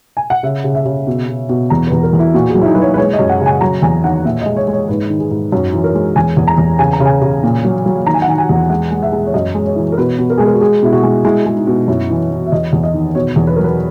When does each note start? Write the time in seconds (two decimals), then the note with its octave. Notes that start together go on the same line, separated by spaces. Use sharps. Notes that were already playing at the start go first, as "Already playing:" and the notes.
0.17 G#5
0.30 F#5
0.43 C#3 E5
0.64 C#3
0.75 E5
0.85 C#3
1.07 B2
1.28 B2
1.49 B2
1.70 E2 A#5
1.87 E2 B4
2.03 A#4
2.13 E2
2.19 E4
2.34 A#2 F#4
2.50 G#4
2.55 F#3
2.61 E4
2.66 D#4
2.75 F#3 B4
2.82 C#5
2.94 B4
2.97 G#3 C#5
3.13 D#5
3.19 F#2
3.29 F#5
3.41 C#3
3.46 G#5
3.61 F#3 A#5
3.82 E2 G#5
4.03 D#3 F#5
4.25 A#2 E5
4.41 G#3 D#5
4.57 C#5
4.68 G#3
4.73 C#5
4.88 G#2 B4
5.10 D#3
5.20 G#4
5.31 G#2
5.52 F#2 F#4
5.73 E3
5.84 A#4
5.95 G#3
6.16 E2 G#5
6.37 E2
6.48 A#5
6.58 E2
6.79 C#3 G#5
6.93 A#5
7.00 C#3
7.05 G#5
7.22 C#3
7.43 A#2
7.64 F#3
7.86 F#3
8.06 D#3 A#5
8.14 G#5
8.22 F#5
8.27 D#3 G#5
8.38 G#5
8.49 E2
8.70 G#3 F#5
8.91 G#3
9.03 E5
9.12 G#3
9.26 C#5
9.34 F#2 D#5
9.55 G#3
9.66 C#5
9.76 E3
9.92 A#4
9.97 B2 B4
10.19 B2
10.30 A#4
10.38 G#3 G#4
10.46 A#4
10.54 F#4
10.61 G#3 G#4
10.83 B2 E4
10.93 F#4
11.03 G#3
11.25 G#3 E4
11.46 G#3
11.56 D#4
11.67 B2
11.88 F#2 E4
12.10 E3
12.31 E3
12.46 E5
12.52 E2 D#5
12.73 E2
12.83 D#5
12.94 D#3
13.15 B2 C#5
13.36 E2
13.47 B4
13.56 F#3 A#4
13.64 B4